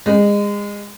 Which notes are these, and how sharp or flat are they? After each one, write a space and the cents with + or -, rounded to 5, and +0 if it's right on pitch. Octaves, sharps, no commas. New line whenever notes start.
G#3 -25